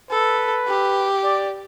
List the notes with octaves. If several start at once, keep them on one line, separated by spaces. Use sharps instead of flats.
A4 B4
G4
D5